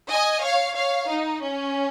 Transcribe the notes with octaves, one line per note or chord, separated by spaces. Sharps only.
D#5 G#5
C#5 F5
C#5 F5
D#4
C#4